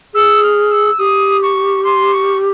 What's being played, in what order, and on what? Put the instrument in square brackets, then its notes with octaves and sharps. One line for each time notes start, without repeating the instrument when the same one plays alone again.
[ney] G#4 [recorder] E6
[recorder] F6
E6
[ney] G4 [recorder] D#6
[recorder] C#6
C6
C#6